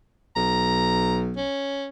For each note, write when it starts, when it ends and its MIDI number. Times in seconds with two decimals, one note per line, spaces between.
0.36 1.43 35
0.36 1.20 82
1.37 1.87 61